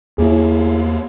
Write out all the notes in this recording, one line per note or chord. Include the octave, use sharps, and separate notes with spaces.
E2 A#3 E4 G#4